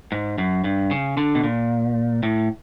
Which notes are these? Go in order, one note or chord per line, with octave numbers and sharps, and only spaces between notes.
G#2
F#2
G2
C#3
D3
B2
A#2
A2